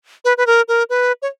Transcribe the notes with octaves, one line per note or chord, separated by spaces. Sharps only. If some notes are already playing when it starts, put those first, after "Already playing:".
B4
B4
A#4
A#4
B4
C#5